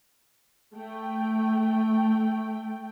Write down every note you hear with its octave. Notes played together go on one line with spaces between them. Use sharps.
A3 G5